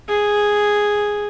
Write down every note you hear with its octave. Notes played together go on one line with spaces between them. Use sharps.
G#4